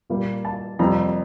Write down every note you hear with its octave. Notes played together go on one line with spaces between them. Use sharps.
A#2 G3 A#3
A5
F2 C3 G3 A#3 A#5